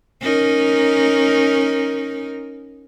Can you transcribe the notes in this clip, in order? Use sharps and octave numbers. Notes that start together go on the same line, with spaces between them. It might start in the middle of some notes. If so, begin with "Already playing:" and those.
C#4 D#4 A#4